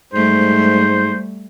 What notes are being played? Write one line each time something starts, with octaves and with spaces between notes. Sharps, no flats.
G#2 G3 A3 C5